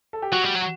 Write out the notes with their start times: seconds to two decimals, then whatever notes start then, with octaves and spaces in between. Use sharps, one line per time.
0.13 A4
0.22 G4
0.32 F#3 F#4
0.44 G3
0.56 F#3